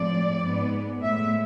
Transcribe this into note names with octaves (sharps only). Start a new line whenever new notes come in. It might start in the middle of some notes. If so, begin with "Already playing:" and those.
Already playing: A2 F3 G#3 C4 D5
G#2 G#3 B3
A2 G#3 B3 E5